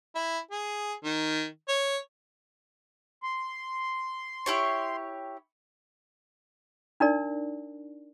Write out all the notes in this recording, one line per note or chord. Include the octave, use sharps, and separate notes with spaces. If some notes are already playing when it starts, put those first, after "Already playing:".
E4
G#4
D#3
C#5
C6
E4 G4 C#5
D4 D#4 A#4 D5